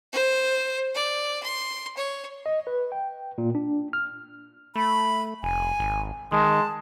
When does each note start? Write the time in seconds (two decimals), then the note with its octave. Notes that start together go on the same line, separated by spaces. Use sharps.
0.13 C5
0.95 D5
1.43 C6
1.97 C#5
2.46 D#5
2.67 B4
2.92 G5
3.38 A#2
3.55 D4
3.93 F6
4.76 A3 B5
5.43 F1 G#5
5.80 G#1
6.32 D#3 G#3 A5